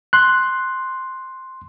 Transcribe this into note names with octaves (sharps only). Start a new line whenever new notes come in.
C6 F#6